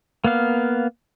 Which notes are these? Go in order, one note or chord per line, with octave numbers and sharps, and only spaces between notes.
A#3 B3 F5